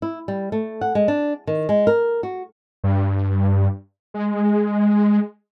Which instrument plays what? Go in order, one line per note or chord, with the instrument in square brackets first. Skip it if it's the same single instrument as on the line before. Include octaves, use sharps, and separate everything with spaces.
[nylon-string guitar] E4
G3
A3
F#5
G#3
D4
D#3
G#3
A#4
F#4
[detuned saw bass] G2
G#3